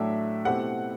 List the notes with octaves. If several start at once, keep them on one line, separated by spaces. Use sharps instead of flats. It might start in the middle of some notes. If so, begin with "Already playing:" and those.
Already playing: A2 F#3 A3 D4 E5
B2 A3 C4 E4 G4 F#5